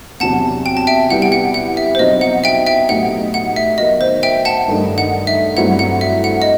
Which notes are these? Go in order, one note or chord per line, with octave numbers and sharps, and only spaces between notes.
E2 C3 F#3 F#5 A5
G5
A5
E5 G5
G3 B3 E4 G4 F#5
G5
F#5
F#5
E5
C5
B2 F#3 C4 D#4 D#5
F#5
E5 G5
E5 G5
A2 F#3 B3 D#4 G4 F#5
F#5
E5
D#3 F#3 B3 D#5
C5
E5 G5
F#5 A5
G2 D#3 A3 D#4
F#5
E5
G2 F#3 A3 C4 E4 F#5
F#5
E5
F#5
D#5